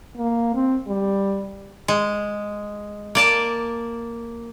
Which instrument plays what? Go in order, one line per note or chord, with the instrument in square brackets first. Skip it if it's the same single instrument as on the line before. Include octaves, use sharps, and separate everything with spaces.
[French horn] A#3
C4
G3
[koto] G#3
A#3 D5 A5